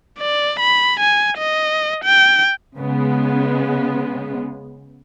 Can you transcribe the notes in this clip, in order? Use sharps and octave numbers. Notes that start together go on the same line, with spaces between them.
D5
B5
G#5
D#5
G5
C#3 G#3 B3